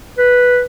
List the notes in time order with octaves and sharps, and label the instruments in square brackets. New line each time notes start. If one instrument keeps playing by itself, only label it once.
[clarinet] B4